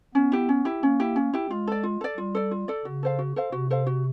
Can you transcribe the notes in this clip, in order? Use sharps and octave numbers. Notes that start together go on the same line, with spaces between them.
B3 C#4
E4 G4
C#4
E4 G4
A#3 C#4
E4 G4
C#4
E4 G4
G#3 F4
A4 D5
F4
A4 D5
G3 F4
A4 D5
F4
A4 D5
C#3 F#4
A4 C5 F5
F#4
A4 C5 F5
C3 F#4
A4 C5 F5
F#4